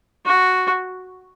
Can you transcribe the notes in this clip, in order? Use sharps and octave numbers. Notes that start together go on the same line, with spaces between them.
F#4